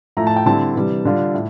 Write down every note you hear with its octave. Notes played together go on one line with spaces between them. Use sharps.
A2 F3 A3 E4 A#5
A5
G5
D3 G3 C4 E4 A5
C3 E3 G3
D3 G3 D4 F4
A2